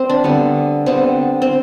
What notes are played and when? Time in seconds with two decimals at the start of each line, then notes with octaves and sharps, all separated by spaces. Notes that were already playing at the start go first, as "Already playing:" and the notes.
Already playing: C4
0.09 D4
0.24 D3 G3 B3
0.86 D3 G3 B3 C4
1.42 C4